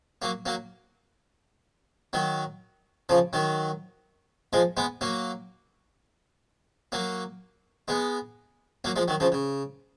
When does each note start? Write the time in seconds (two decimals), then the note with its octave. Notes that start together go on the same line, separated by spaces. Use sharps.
0.22 F#3 A#3
0.46 F#3 A#3
2.13 D#3 F#3
3.09 C#3 F3
3.33 D#3 F#3
4.53 F3 G#3
4.77 G#3 B3
5.01 F#3 A#3
6.92 F#3 A#3
7.88 G#3 B3
8.84 F#3 A#3
8.96 F3 G#3
9.08 D#3 F#3
9.20 C#3 F3
9.32 C#3